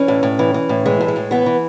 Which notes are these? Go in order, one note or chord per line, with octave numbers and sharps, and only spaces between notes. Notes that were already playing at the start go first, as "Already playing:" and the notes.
Already playing: E3 C#4
A2
A2
E3
E3
A2
E3 G#3
A2
G#3
A2
E3 B3
E3